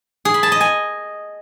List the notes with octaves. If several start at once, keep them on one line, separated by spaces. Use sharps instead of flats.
G#4
B5
A5
D#5
G#5